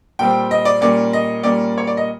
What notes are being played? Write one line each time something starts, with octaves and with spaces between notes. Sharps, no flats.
A#2 G3 C4 G5
D#5
D5
A#2 G3 A#3 C#4 D5
D#5
A#2 G3 A#3 C#4 D5
C#5
D5
D#5